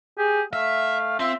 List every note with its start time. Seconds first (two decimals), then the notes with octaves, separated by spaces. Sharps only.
0.18 G4 G#4
0.53 A3 E5 F5
1.20 C4 F4 E5